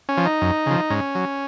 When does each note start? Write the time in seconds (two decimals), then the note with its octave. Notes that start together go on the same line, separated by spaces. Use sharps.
0.09 C#4
0.17 F3
0.26 D#4
0.41 F#2
0.66 C#3 F3
0.90 G#2 C#4
1.15 F#3